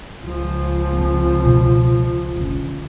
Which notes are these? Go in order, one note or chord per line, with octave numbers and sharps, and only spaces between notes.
C#2 F3
C4
B2
D3 C#4